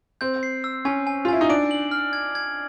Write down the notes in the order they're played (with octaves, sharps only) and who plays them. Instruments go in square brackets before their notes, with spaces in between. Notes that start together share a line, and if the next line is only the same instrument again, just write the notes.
[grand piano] C4 [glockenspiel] G6
[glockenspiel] C7
E6
[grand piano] C#4 [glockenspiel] G#5
[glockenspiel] G#5
[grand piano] F4
[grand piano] E4 [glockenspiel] G#5
[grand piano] D#4
[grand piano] D4 [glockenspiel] D7
[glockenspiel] F#7
F6
G#6
G#6